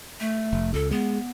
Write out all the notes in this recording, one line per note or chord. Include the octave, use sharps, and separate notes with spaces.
A3
F1
C#2 A4
G#3 B3